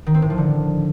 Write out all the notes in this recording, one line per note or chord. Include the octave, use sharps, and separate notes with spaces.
D#3
C4
A2
F3
D3